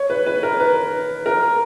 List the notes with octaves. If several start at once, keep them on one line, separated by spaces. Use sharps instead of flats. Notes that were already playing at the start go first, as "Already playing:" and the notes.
Already playing: C#5
B4
B4
A#4
B4
A#4